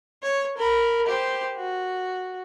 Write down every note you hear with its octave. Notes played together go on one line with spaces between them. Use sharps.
C#5
A#4 B5
G4 C5
F#4